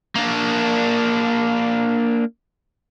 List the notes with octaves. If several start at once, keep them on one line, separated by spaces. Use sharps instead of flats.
A#3 D4